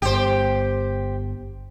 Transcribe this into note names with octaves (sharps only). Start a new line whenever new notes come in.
G1 G4 C5